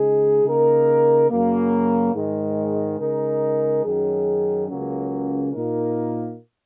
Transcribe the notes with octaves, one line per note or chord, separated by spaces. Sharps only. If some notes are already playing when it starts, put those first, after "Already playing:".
Already playing: C#3 G#3 D#4 G#4
C#3 A#3 D#4 A#4
F#2 C#3 F#3 A#3
G#2 D#3 G#3
C#3 G#3 D#4 A#4
F#2 D#3 F#3 C#4 G#4
C#2 C#3 F#3 A#3 C#4
A#2 A#3 D#4 A#4